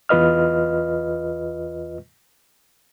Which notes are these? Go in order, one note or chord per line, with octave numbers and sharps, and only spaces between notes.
E2 F4 B4 D#5 F6